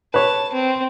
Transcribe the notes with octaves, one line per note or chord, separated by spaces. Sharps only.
B4 C#5 A5
C4